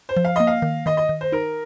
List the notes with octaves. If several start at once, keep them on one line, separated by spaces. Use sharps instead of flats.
C5
F3
F5
A#3 D#5
F5
D#3
D#3 D#5
D#5
D#3
C5
D#4 A#4